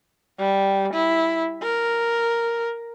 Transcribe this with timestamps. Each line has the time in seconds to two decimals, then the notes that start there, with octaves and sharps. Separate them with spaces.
0.39 G3
0.94 E4
1.63 A#4